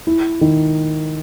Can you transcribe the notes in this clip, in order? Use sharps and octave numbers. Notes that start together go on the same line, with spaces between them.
E4
D#3